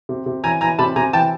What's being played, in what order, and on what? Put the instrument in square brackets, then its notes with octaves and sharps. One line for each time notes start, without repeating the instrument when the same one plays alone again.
[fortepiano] C3
C3
E3 G#5 A#5
E3 G#5 A#5
C3 A5 B5
C3 G#5 A#5
E3 G5 A5